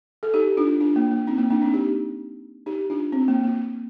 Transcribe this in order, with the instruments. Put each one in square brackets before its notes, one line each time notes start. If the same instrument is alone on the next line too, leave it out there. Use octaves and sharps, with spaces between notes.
[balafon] A4
D#4 G4
D4 F4
D4 F4
A#3
A#3
C4 D#4
A#3
A#3 D4
C4 D#4
D#4 G4
D#4 G4
D4 F4
C4
A#3
A#3